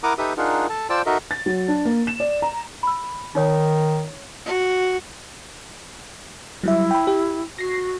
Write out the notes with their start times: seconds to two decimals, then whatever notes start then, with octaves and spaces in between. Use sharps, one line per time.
0.03 E4 A#4 F#5 A#5 D6 D#6
0.18 D#4 G4 A4 B4 E5 D#6
0.37 D4 D#4 F4 G#4 A#4 F#5
0.69 A4 A5
0.90 F4 C5 D5 G5 A5 E6
1.06 D#4 F#4 A4 A#4 D#5 E5
1.31 A6
1.46 F#3
1.68 D4
1.85 A#3
2.07 E7
2.20 D5
2.42 A#5
2.83 B5 E6
3.35 D#3 D#4 C#5 D#6
4.46 F#4
6.64 F#3 G3 E4 E5
6.91 G5 B5
7.07 G4
7.58 F#4 A#6 C7